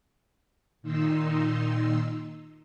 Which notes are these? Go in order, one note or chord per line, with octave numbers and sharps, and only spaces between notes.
A#2 D#3 D#4 C6 E6